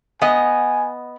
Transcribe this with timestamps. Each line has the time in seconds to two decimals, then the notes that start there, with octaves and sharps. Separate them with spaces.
0.22 B3 D#5 G#5